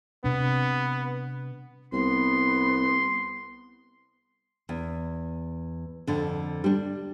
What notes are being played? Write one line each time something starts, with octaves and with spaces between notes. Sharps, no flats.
C3 B3 D4
C2 B3 C6
E2
F2 D3
G3 D4